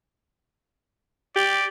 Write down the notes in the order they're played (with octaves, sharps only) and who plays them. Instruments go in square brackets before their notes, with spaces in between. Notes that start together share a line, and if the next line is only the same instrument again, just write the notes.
[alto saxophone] G4 [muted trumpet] D5